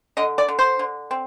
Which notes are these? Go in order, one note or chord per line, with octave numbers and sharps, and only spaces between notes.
D3 D#5
D5
D3
C5
D3
C4